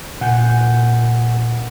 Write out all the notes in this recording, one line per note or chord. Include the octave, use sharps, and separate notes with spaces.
A#2 F#5 G#5 G6